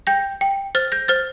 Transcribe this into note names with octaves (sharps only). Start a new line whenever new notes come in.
G5 G6 A#6
G5
C5 F6 A6
G6 A#6
C5 F6 A6